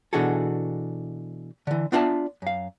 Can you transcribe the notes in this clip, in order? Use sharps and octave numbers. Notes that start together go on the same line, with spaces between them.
B2 E3 D4 F#4 G#4 A4
D3 E3
B3 D4 F4 D5 E5 A5
F#2 F5